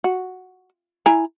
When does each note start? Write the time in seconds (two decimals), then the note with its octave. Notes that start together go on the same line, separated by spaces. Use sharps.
0.04 F#4
1.06 E4 G#5 A#5